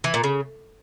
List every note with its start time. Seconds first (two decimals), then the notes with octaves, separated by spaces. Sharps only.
0.04 E3
0.14 A#2
0.24 C#3